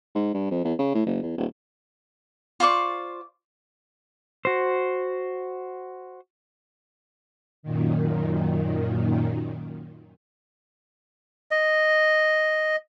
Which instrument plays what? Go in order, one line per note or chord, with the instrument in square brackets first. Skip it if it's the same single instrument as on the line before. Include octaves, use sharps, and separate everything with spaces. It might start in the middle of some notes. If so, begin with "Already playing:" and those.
[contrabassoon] G#2
G2
F2
E2
C#3
A2
F#1
E2
D#1
[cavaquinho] F4 C5 D5 C#6
[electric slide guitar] F#4 C5
[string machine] F#2 A#2 D#3
[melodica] D#5